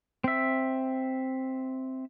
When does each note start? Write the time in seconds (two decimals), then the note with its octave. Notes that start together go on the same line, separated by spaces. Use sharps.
0.24 C4 E5